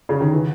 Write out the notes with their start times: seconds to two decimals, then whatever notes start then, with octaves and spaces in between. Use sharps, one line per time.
0.09 C#3
0.20 D#3
0.33 E3